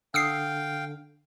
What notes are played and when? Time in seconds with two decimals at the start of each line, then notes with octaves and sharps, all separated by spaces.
0.14 D3 F5 G5 D#6 E6 C7